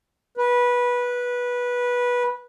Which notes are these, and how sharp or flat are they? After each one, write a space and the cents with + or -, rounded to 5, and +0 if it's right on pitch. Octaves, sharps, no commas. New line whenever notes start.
B4 -15